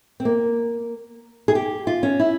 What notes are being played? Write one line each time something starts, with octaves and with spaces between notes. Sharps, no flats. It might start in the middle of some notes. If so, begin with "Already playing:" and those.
C4
A#3
G#4
G4
F4
C#4
E4